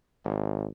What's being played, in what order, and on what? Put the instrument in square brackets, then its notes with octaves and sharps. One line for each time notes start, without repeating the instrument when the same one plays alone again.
[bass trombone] G#1